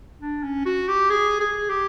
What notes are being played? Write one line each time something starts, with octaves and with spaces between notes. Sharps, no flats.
D4
C#4
F#4
G4
G#4
G#4
G4